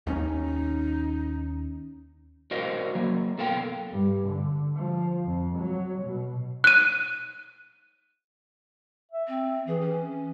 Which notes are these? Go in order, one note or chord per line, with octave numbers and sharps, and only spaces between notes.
D#2 A3 C#4 D#4
F#4 A#4 C5 D5 D#5 F5
F#3 A#3
B3 A4 A#4 F5 G5
G2
D3
F3
F2
F#3
B2
F#6 D#7
E5
C4
E3 G#4
C#4